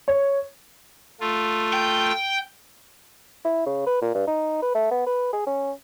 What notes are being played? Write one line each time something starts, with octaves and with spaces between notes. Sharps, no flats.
C#5
A3 F4
G5
E4
C#3
B4
A#2
G2
D#4
B4
A3
B3
B4
G#4
C#4